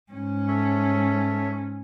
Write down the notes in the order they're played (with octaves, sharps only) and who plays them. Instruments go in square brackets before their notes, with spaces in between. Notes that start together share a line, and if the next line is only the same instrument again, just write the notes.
[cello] G#2 C#4
[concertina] A4 C#5 E5